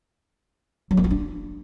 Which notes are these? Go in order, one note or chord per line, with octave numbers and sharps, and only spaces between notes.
F#3
A#3
F4
D4